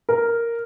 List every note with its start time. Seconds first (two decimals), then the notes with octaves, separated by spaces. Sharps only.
0.09 A#4